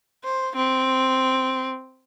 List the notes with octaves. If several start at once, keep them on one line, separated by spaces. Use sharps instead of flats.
C5
C4